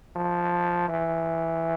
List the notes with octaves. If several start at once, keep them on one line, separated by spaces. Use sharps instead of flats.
F3
E3